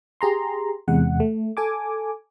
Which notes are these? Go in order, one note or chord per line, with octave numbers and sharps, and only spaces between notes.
G4 G#4 A#5 C6
E2 C3 G#3 F#5
A3
A4 G#5 D6